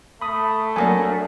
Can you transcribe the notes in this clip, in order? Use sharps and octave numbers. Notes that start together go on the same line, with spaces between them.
A3 B5 D#6
F#3 A#3 D4 G#5